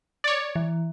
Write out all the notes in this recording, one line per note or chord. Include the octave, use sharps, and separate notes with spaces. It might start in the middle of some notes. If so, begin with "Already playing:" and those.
C#5 D5
E3